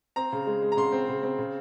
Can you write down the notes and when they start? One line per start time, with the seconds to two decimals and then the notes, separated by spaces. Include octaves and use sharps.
0.16 C4 A#5
0.33 C#3
0.47 G#3
0.62 G#3
0.72 A#5
0.77 C#3 C6
0.92 C4
1.09 C#3
1.23 C4
1.39 C#3